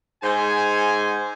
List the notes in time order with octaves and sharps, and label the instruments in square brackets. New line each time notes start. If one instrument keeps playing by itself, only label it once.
[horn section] G#2 C5 G#5